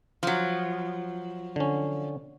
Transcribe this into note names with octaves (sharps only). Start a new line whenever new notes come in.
F3 F#3
D3 C#4